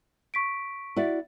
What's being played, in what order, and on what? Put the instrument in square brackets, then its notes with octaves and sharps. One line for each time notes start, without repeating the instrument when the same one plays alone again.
[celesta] C#6 B6 D7
[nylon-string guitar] E4 F#4 D5